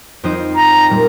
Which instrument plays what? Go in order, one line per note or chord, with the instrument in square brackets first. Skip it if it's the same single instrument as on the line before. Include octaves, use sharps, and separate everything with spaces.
[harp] F2 F3 D#4 C5 D#5
[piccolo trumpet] A#5
[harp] A#2 G3